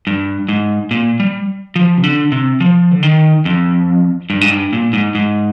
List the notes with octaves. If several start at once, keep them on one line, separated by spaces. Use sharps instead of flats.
G2
G#2
A#2
G3
F3
C3
D3
C3
F3
D3
D#3
F2
G2
G#2
G2
A#2
G#2
G#2